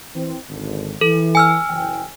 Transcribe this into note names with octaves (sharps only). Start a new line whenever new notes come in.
E3 C4
G#1 D3
E3 A4
G#5 E6 F6
F#1 E3 G5